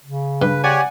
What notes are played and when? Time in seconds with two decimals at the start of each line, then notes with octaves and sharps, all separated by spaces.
0.05 C#3
0.42 G2 B4
0.63 G4 C#5 D5 F#5 G#5